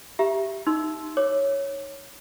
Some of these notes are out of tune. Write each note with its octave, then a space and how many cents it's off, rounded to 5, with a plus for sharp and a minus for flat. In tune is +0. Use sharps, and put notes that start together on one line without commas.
G4 +0 E5 +15 A#5 +30
D#4 +0 C6 +0 E6 +0
C#5 +0 D6 +0